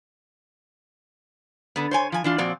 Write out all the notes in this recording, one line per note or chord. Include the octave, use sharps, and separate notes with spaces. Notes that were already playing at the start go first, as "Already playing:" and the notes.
D3 B3
C5 C#5 G#5
F3 G#5
E3 D4 F4
A#2 F3 C4 F#4 D5